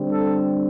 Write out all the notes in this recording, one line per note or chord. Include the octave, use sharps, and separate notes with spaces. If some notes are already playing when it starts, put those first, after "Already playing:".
Already playing: D3 G3 C4
A4